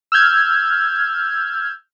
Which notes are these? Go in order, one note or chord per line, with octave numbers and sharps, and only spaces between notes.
E6 F6 G6 G#6